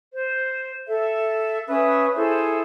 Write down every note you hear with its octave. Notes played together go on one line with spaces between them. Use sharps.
C5
A4 E5
C#4 B4 E5 D#6
E4 G#4 A4 C5